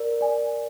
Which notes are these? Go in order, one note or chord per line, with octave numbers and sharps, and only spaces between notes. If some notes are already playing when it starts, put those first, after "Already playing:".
Already playing: A#4 D5
D5 G#5